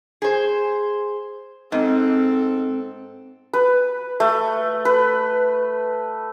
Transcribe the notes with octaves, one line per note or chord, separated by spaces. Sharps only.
G#4 C5
G#2 C4 A4
B4
A3
B4